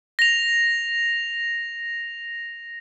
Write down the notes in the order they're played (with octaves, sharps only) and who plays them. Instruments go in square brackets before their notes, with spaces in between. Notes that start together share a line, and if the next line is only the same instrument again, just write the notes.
[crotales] A#6 F7